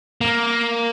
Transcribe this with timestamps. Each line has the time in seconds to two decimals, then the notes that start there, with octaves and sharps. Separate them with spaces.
0.21 A#3